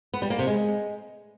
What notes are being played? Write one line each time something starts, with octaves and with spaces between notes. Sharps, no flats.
B3
G3
A#3
C3
G#3